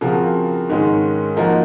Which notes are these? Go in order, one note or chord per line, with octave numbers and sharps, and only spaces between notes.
C#3 F3 C4 F#4 A#4
G#2 D#3 G#3 C#4
F3 A#3 D#4 F#4 A#4